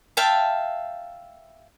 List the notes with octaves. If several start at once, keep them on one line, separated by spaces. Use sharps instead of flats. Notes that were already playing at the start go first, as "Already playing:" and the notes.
E5 F5 G5 A5